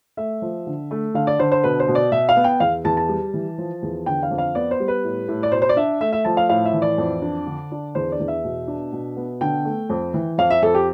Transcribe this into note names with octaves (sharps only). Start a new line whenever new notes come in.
A3 E5
F3
D3
A3
D3 F5
D5
D3 C5
C5
B2 B4
C5
B2
D5
B2 E5
F5
B3
G5
E2 F5
E2 A5
A5
G3
E3
F3
E2
D3 G5
F5
F2
F5
B3 D5
C5
G3
B4
A2
A2
D5
B2 C5
C5
D5
D4 E5
A3 E5
E5
F3 A5
F5
A2 F5
E5
E3
D5
F2
D4
D3
D4
E2 C5
D5
E2
E5
B2
D4
B2
B3
D3 G5
A3
F2
E3
F2 F5
E5
F2 A4
G4